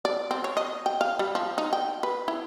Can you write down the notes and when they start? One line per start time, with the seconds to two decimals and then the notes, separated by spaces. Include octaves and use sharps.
0.05 D5
0.31 C4
0.44 C#5
0.57 D#5
0.86 G5
1.01 F5
1.19 G3
1.35 F3
1.58 D#4
1.73 G5
2.03 B4
2.28 E4